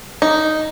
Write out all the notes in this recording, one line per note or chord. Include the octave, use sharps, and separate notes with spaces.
D#4